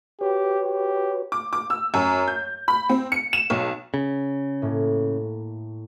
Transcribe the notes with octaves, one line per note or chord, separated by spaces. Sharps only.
F#4 G4 B4 C#5
G4
D6
D6
E6
F#2
G6
B5
C4
C#7
E7
B1
C#3
A2 A#3